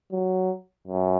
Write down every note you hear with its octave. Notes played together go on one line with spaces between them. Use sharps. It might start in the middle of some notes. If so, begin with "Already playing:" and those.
F#3
F#2